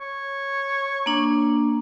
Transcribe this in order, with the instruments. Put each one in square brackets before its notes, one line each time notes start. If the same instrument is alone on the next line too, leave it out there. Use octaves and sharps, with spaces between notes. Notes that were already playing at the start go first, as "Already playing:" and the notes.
[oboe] C#5
[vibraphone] A#3 D4